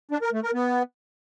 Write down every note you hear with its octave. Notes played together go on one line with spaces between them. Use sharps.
D4
A#4
A3
A#4
B3